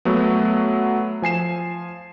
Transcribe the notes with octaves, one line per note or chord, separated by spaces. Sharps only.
F#3 A3 B3
F3 G#5 C7 E7